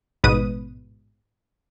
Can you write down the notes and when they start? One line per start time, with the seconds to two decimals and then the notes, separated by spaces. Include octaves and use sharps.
0.24 A1 G#2 B2 B4 D#6 D#7